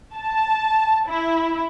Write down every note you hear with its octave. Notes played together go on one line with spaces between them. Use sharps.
A5
E4